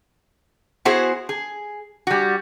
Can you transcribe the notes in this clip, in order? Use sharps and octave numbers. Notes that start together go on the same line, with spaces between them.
B3 E4 F#4 G#4 C5
G#4
G3 F#4